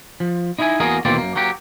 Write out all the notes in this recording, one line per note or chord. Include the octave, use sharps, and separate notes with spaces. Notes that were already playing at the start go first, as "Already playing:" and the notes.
F3
D#4 E4 D#5 E5 G#5
E2 A#3 F#4 G#4 A#4 D#5
D#2 B2 E3 A#3 C4 D5
F#2 A#3
F#3 A#3 F#4 G4